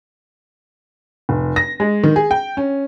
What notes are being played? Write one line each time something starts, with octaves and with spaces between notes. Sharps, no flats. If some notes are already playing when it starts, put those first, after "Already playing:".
F1
A#6
G#3
D#3
G#4
G5
C#4